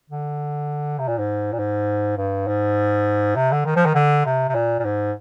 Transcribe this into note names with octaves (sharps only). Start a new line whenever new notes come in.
D3
C3
A#2
G#2
A#2
G#2
G2
G#2
C3
D3
D#3
F3
D#3
D3
C3
C3
A#2
A#2
G#2